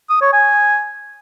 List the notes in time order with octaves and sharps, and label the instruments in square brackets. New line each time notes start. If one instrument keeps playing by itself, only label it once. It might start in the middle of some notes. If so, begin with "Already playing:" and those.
[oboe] D#6
C#5
G#5